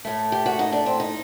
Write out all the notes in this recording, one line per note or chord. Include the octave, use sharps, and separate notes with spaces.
A2 A3
G4
F#4
D#4
D4
C4
D#4